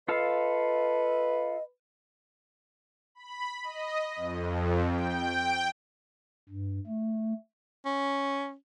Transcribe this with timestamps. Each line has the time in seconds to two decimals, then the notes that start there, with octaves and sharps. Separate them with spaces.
0.08 F4 A4 B4 D#5 F5
3.15 B5
3.64 D#5
4.16 F2
4.87 G5
6.49 G2
6.87 A3
7.85 C#4